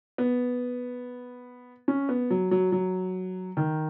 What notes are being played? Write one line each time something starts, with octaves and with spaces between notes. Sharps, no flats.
B3
C#4
B3
F#3
F#3
F#3
D#3